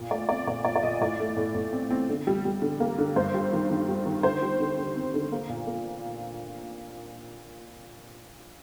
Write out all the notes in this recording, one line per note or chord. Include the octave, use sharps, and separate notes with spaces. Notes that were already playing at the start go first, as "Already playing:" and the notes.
Already playing: A#2
A3 D5
C4 D5
A#2 D5
A#2 D5
D5
A#2 D#5
A2 D5
A3
A2
A2
C4
C4
D3
G3
G3
D3
A#3
D3
G2 C5
G3
D#3
D#3
G3
D#3
D3 C5
G3
D3
D3
C4
D3
A#3
A#2
A#3